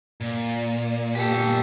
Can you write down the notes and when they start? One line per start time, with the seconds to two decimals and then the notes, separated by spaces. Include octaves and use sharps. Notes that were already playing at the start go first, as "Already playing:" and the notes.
0.21 A#2
1.15 G4 A4